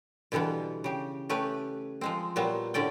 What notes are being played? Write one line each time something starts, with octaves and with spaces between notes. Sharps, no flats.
B2 D3 E3 G3 B3
C#3 G4
A3 C#4 G4 B4
F3 G#3 C4
A#2 F#3 G3 B3 C4
A2 D3 C#4 D5 G5